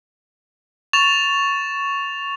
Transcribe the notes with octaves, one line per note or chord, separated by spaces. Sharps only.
C#6 A6 E7 F7